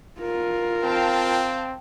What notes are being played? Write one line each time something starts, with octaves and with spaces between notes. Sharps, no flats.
F4 A#4
C4 F5 G5 A5